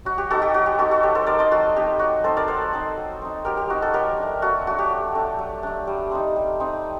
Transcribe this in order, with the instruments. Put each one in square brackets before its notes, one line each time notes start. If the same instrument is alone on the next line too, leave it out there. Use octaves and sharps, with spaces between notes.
[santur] F#3 F#4
G4
C4 D#4 F#4 A4
G4
F#3 F#4
G4
C4 D#4 F#4 A4
F#4 A4
F#3 G4
A4 C5
C4 D#4 A#4 D5
C5 D#5
F#3 F#4 A4
C4 D#4 G4
F#3 F#4
C4 D#4 A4 C5
A#4 D5
F#3 A4 C5
C4 D#4
F#3
C4 D#4
F#3 G4 A#4
G4
C4 D#4 F#4
F#4 A4
F#3 G4 A#4
D4
A3
F#3 F#4 A4
A3 D4 F#4
G4
F#3
A3 D4
F#3
A3 D4
G3
C4 D#4
G3
C4 D#4